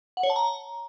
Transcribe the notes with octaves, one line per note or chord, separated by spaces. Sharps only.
F#5
C#5
A5
A#5